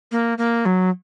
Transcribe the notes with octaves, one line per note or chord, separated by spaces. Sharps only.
A#3
A#3
F#3